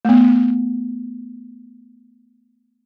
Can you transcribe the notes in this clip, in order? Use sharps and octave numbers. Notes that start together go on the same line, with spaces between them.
A3 B3